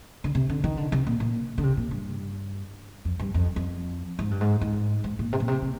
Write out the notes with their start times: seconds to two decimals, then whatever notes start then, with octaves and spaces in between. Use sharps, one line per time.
0.24 D3
0.35 C3
0.50 D3
0.64 D#3
0.77 D3
0.92 C3
1.07 A#2
1.20 A#2
1.58 D3
1.63 C3
1.77 A#2
1.91 G2
3.05 F2
3.19 G2
3.34 F2
3.56 F2
4.19 G#2
4.31 G2
4.41 G#2
4.61 G#2
5.04 G#2
5.19 A#2
5.33 C3
5.40 A#2
5.48 C3
5.62 C3